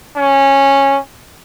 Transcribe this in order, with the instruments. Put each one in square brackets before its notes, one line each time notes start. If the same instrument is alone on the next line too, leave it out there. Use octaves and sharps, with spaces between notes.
[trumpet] C#4